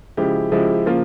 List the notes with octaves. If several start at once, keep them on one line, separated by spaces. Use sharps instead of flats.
C#3 F3 G#3 E4 G4
C#3 F3 G#3 E4 G4
C#3 F3 A#3 F4